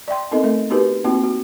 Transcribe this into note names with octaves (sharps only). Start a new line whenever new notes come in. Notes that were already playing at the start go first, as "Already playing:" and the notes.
D5 E5 G5 C6
B3 C4 D#4 A4 A#4 D#5
A3 A#4 E5
B3 D#4 F#4 G4 A#4 B4
A#3 C4 D#4 F4 F#4
F#4